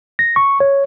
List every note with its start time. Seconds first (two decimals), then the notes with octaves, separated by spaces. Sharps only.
0.19 A#6
0.36 C#6
0.60 C#5